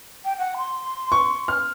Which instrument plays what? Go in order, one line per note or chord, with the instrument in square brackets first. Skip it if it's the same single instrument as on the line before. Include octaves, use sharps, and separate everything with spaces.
[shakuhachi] G5
F#5
C6
[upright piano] C#6
F6